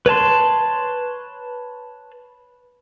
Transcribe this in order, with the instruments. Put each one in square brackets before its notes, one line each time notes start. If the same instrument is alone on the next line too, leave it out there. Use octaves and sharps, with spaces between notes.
[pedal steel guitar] B4 C#5 A5 C6